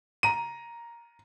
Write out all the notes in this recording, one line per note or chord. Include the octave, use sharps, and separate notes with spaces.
A#5 D#7